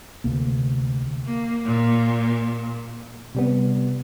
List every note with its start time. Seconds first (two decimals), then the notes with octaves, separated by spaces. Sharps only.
0.24 D2 C3 A#3
1.26 A#3
1.65 A#2
3.35 C3 G3 B3